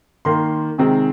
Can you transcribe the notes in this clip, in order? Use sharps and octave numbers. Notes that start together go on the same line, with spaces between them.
D#3 A#3 C6
C3 D#3 G#3 C4